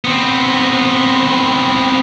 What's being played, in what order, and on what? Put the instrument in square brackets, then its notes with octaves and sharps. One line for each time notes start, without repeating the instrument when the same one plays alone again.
[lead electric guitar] B3 C4